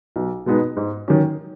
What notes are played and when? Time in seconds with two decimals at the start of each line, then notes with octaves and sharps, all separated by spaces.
0.16 B1
0.46 B2 G#3 B3 D#4
0.77 G#2
1.08 D#3 F#3 C#4